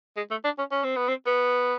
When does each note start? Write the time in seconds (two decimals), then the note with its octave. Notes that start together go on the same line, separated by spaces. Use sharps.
0.17 G#3
0.31 A3
0.44 D4
0.58 C#4
0.72 C#4
0.84 C4
0.96 B3
1.08 C4
1.26 B3